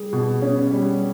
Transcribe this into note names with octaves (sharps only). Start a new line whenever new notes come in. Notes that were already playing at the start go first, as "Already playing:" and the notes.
Already playing: G3 G#4
B2
C#4
G3